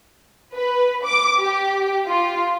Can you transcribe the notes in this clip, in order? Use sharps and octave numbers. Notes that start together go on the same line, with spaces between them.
B4
D6
G4
F4